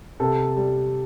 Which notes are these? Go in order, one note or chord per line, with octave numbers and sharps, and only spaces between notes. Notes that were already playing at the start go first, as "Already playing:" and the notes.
C3 A4
G3